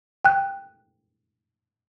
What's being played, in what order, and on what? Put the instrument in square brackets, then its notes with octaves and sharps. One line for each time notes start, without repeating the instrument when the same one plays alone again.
[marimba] G5 F#6